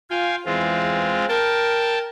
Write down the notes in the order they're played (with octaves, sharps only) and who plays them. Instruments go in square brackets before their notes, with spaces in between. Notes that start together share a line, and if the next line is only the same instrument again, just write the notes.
[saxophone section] F4 [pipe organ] F5 G5 G#5
[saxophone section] E2 E3 [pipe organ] G#3 C4 F4
[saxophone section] A#4 [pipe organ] G5 A5